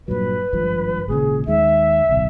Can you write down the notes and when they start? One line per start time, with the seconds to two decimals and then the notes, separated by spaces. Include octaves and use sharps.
0.08 G2 A#2 F#3 B4
0.53 G#1 G2 F3
1.08 G#1 A#2 C#3 G#4
1.47 D#2 D#3 G#3 E5
2.09 D1 B1